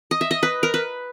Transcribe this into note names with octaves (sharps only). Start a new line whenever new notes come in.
D#5
E5
D#5
B4
A#4
B4